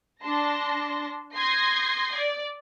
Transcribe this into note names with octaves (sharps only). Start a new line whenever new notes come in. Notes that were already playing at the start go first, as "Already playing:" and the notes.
D4 A5 C6 A#6
C6 D#6 G6 G#6 A#6 C7
D5